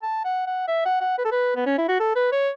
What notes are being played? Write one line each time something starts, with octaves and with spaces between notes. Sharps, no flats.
A5
F#5
F#5
E5
F#5
F#5
B4
A4
B4
B3
C#4
E4
F#4
A4
B4
C#5